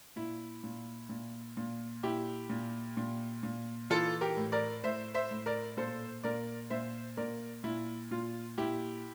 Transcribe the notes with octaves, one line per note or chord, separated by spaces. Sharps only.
A#2 E4
A#2
A#2
A#2
A#2 E4 G4
A#2
A#2
A#2
E3 F4 A4
G4 A#4
A2
A#4 D5
A2 C5 E5
C5 E5
A2
A#4 D5
A#2 A4 C5
A#2 A#4 D5
A#2 C5 E5
A#2 A#4 D5
A#2 E4
A#2 F4
A#2 E4 G4